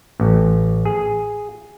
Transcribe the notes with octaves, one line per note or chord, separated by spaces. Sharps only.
A1
G#4